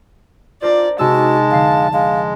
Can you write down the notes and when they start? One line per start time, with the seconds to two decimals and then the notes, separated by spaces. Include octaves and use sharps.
0.62 D4 F4 A#4 C5 D5
0.99 C3 G#3 D#4 F#4 A5 E6
1.51 F1 D3 F5 C7
1.93 G#3 F5